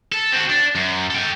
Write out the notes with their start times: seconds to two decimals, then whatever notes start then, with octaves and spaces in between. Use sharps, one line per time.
0.12 A4
0.33 C4 F#4
0.50 D4
0.75 F#2
1.10 A4 G5